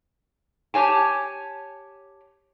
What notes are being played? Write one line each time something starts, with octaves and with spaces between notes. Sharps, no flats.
G4 C#5 G#5 A5